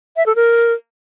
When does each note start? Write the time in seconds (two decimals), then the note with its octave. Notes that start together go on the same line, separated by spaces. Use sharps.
0.17 E5
0.26 A4
0.36 A#4